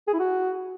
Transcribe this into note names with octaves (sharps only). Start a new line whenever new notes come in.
G#4
E4
F#4